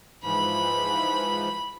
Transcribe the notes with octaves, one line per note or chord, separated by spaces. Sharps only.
G#2 E3 F3 B5